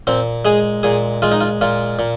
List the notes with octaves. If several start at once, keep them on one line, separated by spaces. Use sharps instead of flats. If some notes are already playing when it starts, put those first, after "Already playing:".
A#2 C4
G#3 G#4
A#2 G#4
G#3 F4
D#4
F4
A#2 F4
A#2